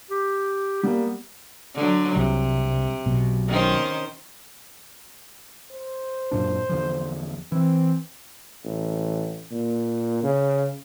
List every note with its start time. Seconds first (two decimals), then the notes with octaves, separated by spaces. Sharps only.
0.10 G4
0.83 G3 A#3 B3
1.75 D3 F#3
2.16 C2 C3
3.06 B1 B2
3.48 D#3 C#4 C5
5.72 C5
6.31 F#2 A#2 D4
6.69 E2 D3 F3
7.52 E3 C4
8.65 A1
9.51 A#2
10.23 C#3